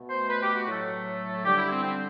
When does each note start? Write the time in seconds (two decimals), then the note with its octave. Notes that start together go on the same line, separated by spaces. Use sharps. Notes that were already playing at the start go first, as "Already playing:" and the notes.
Already playing: B2 A3
0.10 C5
0.29 B4
0.42 G4
0.54 F#4
0.67 A2 F#3 A3
1.45 D3 G3 G4
1.57 E4
1.71 C4
1.83 C4